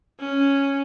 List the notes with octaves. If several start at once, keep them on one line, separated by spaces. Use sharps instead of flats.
C#4